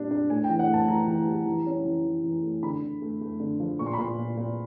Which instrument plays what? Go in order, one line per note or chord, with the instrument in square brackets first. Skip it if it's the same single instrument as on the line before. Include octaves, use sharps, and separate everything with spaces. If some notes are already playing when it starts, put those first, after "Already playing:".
Already playing: [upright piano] A#2 G3 D4
D4
A2 G#5
G5
E3
F#5
A2 A5
E3 A#5
E3
G3
E3
C#4
E3
E3
E3
A3
D3 B5
D3
A3
A3
D3
F3
A#2 C#6
C6
B5
A#2 C6
A#2
A#2